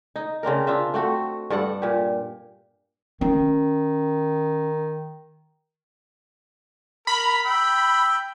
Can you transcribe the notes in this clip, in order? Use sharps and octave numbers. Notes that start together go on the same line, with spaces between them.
D#4
C#3 C4 D4 A#4
D4 F4 E5
A3 C4 F#4
G2 A4 D5 F#5
A#2 G4
D#3 C#4
A#4 B5
G5 E6